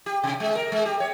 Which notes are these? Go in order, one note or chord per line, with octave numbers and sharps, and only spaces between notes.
G4
C3
G#3
A#4
G#3
G4
C#5